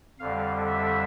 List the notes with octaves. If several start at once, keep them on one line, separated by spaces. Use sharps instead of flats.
F2 D3 G3 F5
E5